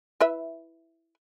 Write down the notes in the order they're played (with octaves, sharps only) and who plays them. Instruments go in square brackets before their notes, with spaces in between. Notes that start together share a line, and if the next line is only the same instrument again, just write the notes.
[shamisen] E4 B4 E5